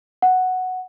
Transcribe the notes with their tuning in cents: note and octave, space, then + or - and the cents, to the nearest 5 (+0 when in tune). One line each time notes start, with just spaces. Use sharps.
F#5 +0